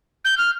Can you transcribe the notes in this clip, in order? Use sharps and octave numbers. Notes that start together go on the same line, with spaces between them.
G6
F6